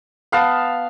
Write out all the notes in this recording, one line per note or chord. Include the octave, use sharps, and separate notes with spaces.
B3 F5 A5